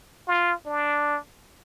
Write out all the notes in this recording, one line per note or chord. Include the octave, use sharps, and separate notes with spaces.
F4
D4